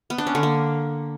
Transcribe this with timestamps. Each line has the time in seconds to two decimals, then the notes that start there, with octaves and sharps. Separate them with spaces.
0.10 B3
0.18 D4
0.27 C#4
0.35 D3
0.43 A#3